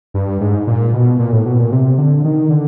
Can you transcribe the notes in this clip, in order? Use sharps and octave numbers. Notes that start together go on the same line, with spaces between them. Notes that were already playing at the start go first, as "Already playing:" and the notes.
G2
G#2
A#2
B2
A#2
A2
B2
A#2
C3
D3
D#3
D3